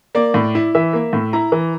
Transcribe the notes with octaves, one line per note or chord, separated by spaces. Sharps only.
A#3 D5
A2
E4
E3 E5
A#3
A2
E4 A#5
E3